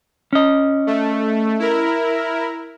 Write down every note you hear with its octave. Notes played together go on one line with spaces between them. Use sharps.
C#4 D#5
A3
E4 A#4